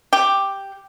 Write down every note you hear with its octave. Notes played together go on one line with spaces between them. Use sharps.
G4